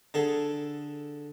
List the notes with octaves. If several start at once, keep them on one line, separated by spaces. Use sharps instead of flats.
D3 G#4 A4